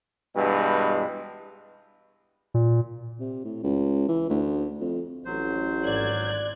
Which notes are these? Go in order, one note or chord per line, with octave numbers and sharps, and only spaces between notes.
G2 B2 E3 G#3
A#2
C3
A2
C#2
E3
D2
F2
A1 F#3 C5
G#1 D5 F#6 G#6